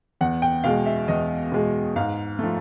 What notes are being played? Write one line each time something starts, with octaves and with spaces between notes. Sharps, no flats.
E2 F#5
G5
B2 G#3 F5
E5
E2 D#5
B2 G#3
G#2 F5
F3 A3